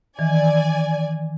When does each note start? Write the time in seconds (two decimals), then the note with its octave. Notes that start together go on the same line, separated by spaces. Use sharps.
0.19 D#3 E3 D5 G#5